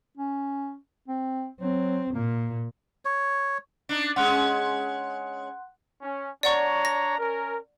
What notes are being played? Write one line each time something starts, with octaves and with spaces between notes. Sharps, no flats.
C#4
C4
F#3 C4
A#2 A#3
C#5
D4 D#4
G#3 C#4 F#5 C6 F#6
C#4
D4 C#5 D5 F#5 A#5 C#6
A#6
C#4 A#4